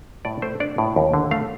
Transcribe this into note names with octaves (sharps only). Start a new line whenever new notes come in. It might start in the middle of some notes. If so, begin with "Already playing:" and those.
A2 D5
A3 C5
D4 D5
A2
D#2
D3
A3 F5